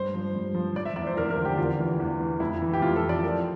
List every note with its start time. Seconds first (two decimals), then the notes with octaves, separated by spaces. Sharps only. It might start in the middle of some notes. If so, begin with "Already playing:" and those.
Already playing: G2 C5
0.14 F3
0.35 G2
0.55 F3
0.76 F3 D5
0.85 E5
0.96 E2 D5
1.07 C5
1.16 E2 A#4
1.30 A#4
1.38 D3
1.45 G4
1.58 E2 F4
1.79 E3
2.00 E2
2.20 E3
2.40 F2 E4
2.62 E3
2.73 G4
2.82 F2 F4
2.96 A4
3.02 E3
3.09 D5
3.23 F3 A#4